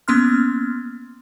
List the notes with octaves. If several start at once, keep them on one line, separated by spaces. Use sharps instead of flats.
A#3 B3 C#4 C6 F6